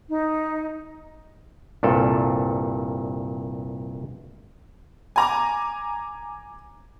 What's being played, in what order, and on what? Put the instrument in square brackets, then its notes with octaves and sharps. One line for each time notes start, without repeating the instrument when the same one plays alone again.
[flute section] D#4
[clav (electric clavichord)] C2 G2 A#2 A4
[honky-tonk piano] G#5 A#5 D6